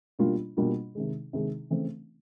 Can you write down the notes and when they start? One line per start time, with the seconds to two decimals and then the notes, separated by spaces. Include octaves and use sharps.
0.19 B2 G3 A#3 D4 F4
0.57 B2 G3 A#3 D4 F4
0.95 C3 D#3 G#3
1.33 C3 D#3 G#3
1.70 C#3 E3 A3 C4